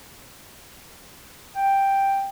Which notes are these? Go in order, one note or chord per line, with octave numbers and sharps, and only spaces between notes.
G5